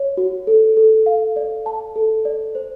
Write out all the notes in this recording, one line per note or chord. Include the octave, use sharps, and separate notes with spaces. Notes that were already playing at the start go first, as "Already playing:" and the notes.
Already playing: C#5
F#4
A4
A4
F5
D5
A5
A4
D5
C5